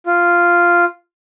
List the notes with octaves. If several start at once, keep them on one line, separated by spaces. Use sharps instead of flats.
F4